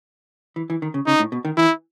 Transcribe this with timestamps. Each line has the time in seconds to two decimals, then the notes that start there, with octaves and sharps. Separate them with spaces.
0.56 E3
0.70 E3
0.82 D#3
0.94 C#3
1.06 C#3 D#4
1.20 A2
1.32 B2
1.45 D#3
1.57 E3 E4